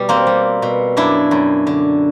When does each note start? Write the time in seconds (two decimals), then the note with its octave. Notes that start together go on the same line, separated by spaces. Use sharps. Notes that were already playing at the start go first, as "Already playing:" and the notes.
Already playing: B2 G3
0.09 A#3 C4
0.27 G3
0.62 B2
0.97 F#2 D4 E4
1.31 F#2
1.67 D3